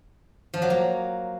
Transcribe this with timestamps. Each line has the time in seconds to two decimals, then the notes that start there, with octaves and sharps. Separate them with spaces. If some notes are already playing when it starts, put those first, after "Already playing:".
0.54 F3
0.62 F#3
0.70 A#3